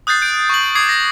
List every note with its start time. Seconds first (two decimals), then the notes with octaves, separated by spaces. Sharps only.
0.07 D#6 F#6 G6 A6 C7
0.21 G6 D7
0.50 C#6 F#7
0.75 D6 D#6 G#6 C7
0.89 A#6